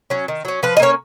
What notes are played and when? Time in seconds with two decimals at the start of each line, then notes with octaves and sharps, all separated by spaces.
0.10 F#3 C#4
0.28 D#3
0.45 F#3 C#4
0.63 F3 B4
0.77 D#5
0.80 A#3 C#4 C#5